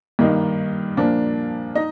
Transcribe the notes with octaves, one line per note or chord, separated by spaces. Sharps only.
G2 D#3 A#3 D#4
A#2 F3 A#3 D4
D#4 D#5